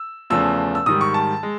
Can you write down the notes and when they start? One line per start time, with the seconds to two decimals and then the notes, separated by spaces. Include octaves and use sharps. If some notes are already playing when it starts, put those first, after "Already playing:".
Already playing: E6
0.30 E2 C#3 F3 A3 E6
0.75 E6
0.86 G#2 D#3 G3 D#6
1.01 C#6
1.14 A5
1.43 G#3